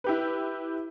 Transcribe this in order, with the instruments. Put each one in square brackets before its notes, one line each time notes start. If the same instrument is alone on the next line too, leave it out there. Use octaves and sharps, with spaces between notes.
[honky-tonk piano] E4 G4 B4